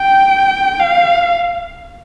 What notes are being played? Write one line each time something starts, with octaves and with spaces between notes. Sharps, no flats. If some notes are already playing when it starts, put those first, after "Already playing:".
Already playing: G5
F5